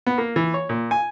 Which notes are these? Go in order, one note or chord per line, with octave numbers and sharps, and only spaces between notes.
B3
A#3
E3
C#5
A#2
G#5